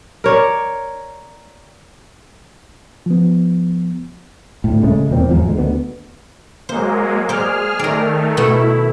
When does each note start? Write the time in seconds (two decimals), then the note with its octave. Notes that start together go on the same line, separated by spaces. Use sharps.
0.24 A#4 C#5 D5
3.06 F3 B3
4.64 D2 A2
4.84 C#3 G#3 A3 C#4
5.09 E1 E2 A#2 C4
5.29 E2 G#2 F3 F#3
5.43 D2 G#3
5.57 D2 B3
6.69 F#3 G#3 A#3 C5
7.29 G#4 C5 D5 F6
7.79 D#3 A3 A#4 D5
8.37 B2 A3 E4